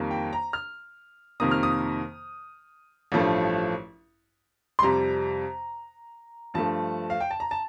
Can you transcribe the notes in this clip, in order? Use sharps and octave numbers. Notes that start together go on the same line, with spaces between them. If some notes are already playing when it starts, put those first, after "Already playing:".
Already playing: F2 D#3 G3 A#3
G5
A#5
F6
F2 C3 D#3 A#3 D#6
F6
D#6
A1 G2 F3 A3
C6
F2 C3 G3 A#5
G2 F3 A3 A5
F5
G5
A5
A#5
A5